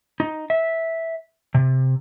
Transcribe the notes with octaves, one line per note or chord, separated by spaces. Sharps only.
D#4
E5
C3